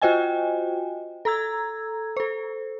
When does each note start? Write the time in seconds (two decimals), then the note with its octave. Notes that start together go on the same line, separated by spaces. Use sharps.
0.02 F4 F#4 C5 D#5 G5 G#5
1.25 A4 A#5 E6 G#6
2.17 A4 C5